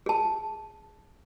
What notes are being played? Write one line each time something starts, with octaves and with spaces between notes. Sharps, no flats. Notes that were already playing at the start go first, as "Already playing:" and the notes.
G#4 A5